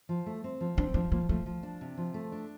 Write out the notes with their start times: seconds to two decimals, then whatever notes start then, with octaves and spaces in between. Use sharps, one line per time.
0.09 F3
0.26 A3
0.44 C4
0.61 F3
0.77 C4 D4
0.94 F3 D4
1.12 F3 A#3
1.29 F3 A3
1.46 F3
1.63 D4
1.81 C3
1.97 F3
2.14 A3
2.32 D4